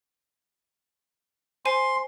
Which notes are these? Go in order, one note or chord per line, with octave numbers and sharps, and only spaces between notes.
C5 G#5 C6